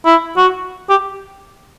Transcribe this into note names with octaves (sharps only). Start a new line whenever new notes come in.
E4
F#4
G4